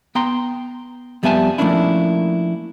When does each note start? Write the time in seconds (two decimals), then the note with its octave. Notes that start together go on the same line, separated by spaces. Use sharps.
0.15 B3 G5 A#5 C6
1.23 F2 G3 B3 E5 G#5 A5
1.58 F3 A3 A#3 C#4 D4 E4